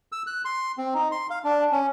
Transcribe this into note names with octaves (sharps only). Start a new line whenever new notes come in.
E6
F#6
C6
C4
D#4
C6
F5
D4
C#4